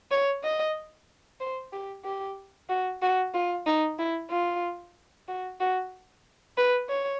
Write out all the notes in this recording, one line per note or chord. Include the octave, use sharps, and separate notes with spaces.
C#5
D#5
C5
G4
G4
F#4
F#4
F4
D#4
E4
F4
F#4
F#4
B4
C#5